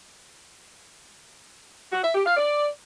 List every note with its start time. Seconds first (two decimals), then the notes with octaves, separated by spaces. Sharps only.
1.92 F#4
2.03 E5
2.14 G4
2.25 F5
2.36 D5